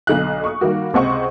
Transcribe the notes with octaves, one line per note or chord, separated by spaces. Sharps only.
B1 D3 D#5 F5 F#6
C#6 D#6
D#3 G3 A#3 F#4
C#2 C3 C5 D#5 F#5 C#6